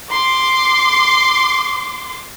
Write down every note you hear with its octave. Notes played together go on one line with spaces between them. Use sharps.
C6 D6